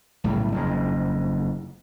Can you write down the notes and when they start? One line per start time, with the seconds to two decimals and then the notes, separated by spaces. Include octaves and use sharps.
0.24 B1 A2 C#3 G3
0.52 F#1 F2 G#2